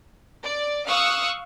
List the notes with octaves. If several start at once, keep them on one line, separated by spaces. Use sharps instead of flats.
D5
F5 C#6 D#6 E6 F#6